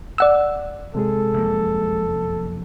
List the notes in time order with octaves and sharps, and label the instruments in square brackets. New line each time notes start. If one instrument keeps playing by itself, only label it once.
[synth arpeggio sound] D5 F#5 E6
[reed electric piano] C3 G#3 G#4 [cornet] A4
[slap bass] F1 F#2 A#3